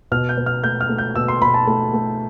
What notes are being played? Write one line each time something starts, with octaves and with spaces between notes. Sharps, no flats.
B2 F6
G6
B2
F6
A3 G6
F6
A3
G6
B2 E6
C6
B2 B5
A5
A3 A5
A3